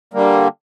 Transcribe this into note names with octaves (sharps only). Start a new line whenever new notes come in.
D3 G3 A#3